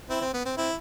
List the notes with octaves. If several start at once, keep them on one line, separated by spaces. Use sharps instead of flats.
C4 E4
C4
B3
C4
C4 E4